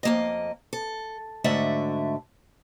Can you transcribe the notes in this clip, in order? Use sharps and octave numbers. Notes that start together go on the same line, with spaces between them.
F2 A#3 D#5
A4
G#2 D3 A3 F#4 E5